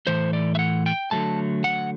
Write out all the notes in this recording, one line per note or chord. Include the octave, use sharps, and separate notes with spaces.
A2 E3 A3 C5
D5
E5
F#5
G5
D3 F#3 A3 A5
F#5